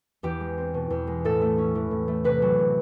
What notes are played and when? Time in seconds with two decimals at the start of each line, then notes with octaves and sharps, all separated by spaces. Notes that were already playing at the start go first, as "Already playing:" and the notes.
0.23 E2 G4
0.41 G#3
0.58 C4
0.74 B2
0.90 E2
1.07 G#3
1.25 A2 A4
1.41 A3
1.58 C#4
1.75 E3
1.91 A2
2.08 A3
2.24 C3 B4
2.42 F#3
2.59 C3